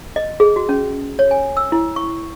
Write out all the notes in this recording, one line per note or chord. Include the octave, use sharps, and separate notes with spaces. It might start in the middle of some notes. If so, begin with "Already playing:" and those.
D#5
G#4
F#4
C#4
C#5
G#5
E6
E4
C#6